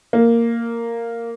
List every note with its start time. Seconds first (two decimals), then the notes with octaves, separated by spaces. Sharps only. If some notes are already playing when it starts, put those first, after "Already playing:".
0.13 A#3